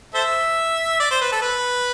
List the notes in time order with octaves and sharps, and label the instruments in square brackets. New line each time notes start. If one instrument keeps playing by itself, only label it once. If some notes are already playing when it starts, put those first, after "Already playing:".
[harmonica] A4 C5 E5
D5
C5
B4
A4
B4